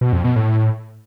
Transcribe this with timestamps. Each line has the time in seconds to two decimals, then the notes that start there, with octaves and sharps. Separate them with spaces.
0.01 B2
0.13 F2
0.24 B2
0.36 A2